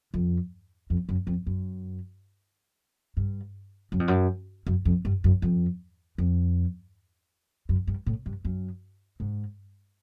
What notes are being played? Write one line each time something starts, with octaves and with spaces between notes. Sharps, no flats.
F2
F2
F#2
F2
F#2
G2
F#2
F2
F#2
F#2
F2
G2
F#2
F2
F2
F#2
G2
A2
G2
F#2
G#2